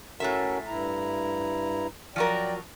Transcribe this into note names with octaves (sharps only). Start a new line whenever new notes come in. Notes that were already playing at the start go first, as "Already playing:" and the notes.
A2 C#4 F#4 A4 A#4 E5
G2 E4 A#5
F3 F#3 A#4 D5 G5